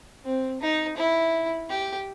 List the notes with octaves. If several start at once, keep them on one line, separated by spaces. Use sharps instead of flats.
C4
D#4
E4
G4